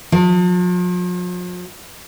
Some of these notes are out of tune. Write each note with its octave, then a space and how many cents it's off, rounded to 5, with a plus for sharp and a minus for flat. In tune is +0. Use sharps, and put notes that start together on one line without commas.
F3 +45